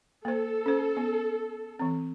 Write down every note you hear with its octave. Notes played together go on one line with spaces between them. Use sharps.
A#3 A4 C5
C#4 C5
B3
E3 C4